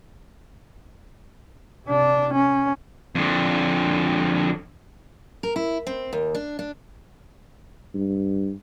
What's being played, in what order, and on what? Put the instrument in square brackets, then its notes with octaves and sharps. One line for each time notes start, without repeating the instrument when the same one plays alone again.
[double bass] C3 D4
C#4
[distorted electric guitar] F2 D3
[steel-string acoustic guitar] A#4
E4
C4
D#2
D4
D4
[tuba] G2